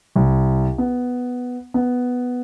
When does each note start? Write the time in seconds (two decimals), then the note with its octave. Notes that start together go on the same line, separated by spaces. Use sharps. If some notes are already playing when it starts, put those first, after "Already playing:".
0.16 C2
0.78 B3
1.74 B3